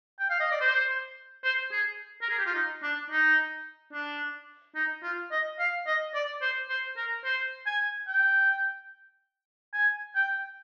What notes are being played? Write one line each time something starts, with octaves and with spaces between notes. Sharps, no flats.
G5
F5
D#5
D5
C5
C5
G#4
A#4
G#4
G4
F4
D#4
D4
D#4
D4
D#4
F4
D#5
F5
D#5
D5
C5
C5
A#4
C5
G#5
G5
G#5
G5